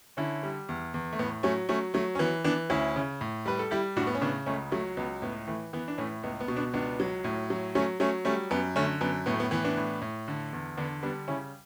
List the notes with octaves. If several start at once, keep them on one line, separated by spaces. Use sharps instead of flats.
D3 C#4 E4
G3
E2
E2
A3
A2 B3
F#3 A3 C#4
F#3 A3 C#4
F#3 A3
C#4
E3 B3
E3 B3 D4
D2 C#4 E4
C#3
A2
G3 B4
A4
G3 E4 G4
A2 D4 F#4
B3
C#4
C#3 B3 D4
C#2 A3 C#4
F#3 A3
C#2 B3
A2 B3
E3 A3
E3 B3
D4
A2 A3 C#4
C#2 B3
B3
B2
B3 D4
C#2 B3 D4
F#3
A2
F#3
F#3 A3 C#4
F#3 A3 C#4
G3 A3 C#4
F#2 B3
D3 A3 C#4
F#2 B3
A2 B3
A3
B3
E3 B3
B3 D4
A2
A2
D3
E2
D3 B3 D4
G3 B3 D4
C#3 C#4 E4